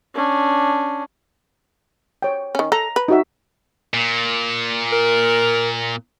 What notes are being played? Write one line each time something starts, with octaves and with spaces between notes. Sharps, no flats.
C#4 D4
C#5 G5
D#3 C#4
A4 A#5
B4
D#4 F#4 E5
A#2
A#4